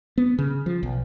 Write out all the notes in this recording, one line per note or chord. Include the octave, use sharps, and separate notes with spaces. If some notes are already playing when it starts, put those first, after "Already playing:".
B3
C#3
F3
B1